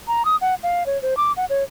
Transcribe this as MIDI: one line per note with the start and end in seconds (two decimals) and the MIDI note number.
0.08 0.25 82
0.25 0.36 87
0.41 0.55 78
0.63 0.86 77
0.86 1.00 73
1.02 1.17 72
1.17 1.32 86
1.37 1.45 78
1.50 1.64 73